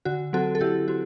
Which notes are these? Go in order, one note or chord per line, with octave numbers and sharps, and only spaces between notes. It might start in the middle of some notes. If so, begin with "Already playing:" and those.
D3 F#4
F#3 C4 F#4 A4
A4
D3 E4 G4
F#3 C4 F#4